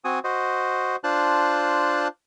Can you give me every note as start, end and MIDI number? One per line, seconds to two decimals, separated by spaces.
0.05 0.19 60
0.05 0.19 66
0.05 0.19 80
0.05 0.19 87
0.24 0.96 66
0.24 0.96 72
0.24 0.96 75
1.04 2.08 62
1.04 2.08 65
1.04 2.08 72
1.04 2.08 81
1.04 2.08 90